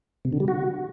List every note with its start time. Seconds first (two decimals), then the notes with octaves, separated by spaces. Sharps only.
0.25 C3
0.33 D3
0.40 G3
0.48 F#4